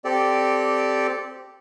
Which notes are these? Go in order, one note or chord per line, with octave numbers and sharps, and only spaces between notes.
C4 G4 A4 D5